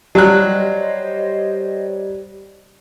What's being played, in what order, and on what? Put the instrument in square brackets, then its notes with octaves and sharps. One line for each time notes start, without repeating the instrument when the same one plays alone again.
[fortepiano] F#3 F#6 [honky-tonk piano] G3 [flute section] C5 C#5 D#5